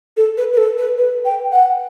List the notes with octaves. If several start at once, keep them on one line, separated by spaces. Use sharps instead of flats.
A4
B4
B4
A4
B4
B4
G5
F#5